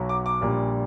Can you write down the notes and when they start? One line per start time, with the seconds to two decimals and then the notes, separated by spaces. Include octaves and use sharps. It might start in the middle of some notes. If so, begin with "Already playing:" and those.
Already playing: B1 B2 F#3
0.09 D6
0.26 D6
0.41 A#1 A#2 G3